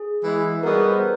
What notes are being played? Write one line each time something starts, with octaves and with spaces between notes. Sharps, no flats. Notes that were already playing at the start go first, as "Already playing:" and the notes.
Already playing: G#4
E3 G#3 B3 E4
G3 B3 D#4 F#4 G#4 A#4
A4 B4
A#4 C5